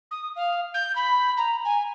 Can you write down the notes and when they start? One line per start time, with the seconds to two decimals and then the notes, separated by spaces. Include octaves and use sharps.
0.11 D#6
0.36 F5
0.74 G6
0.95 B5
1.37 A#5
1.65 G#5